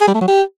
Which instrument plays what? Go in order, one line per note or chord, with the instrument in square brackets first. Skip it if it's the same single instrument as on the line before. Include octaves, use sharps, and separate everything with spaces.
[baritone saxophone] G#4
G3
A3
F#3
G4